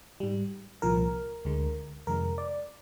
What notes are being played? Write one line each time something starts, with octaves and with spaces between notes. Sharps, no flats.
G#2 G3
C2 A#2 F3 A#4
D2 D3 G#3
F2 C3 D#3 G#3 A#4
D5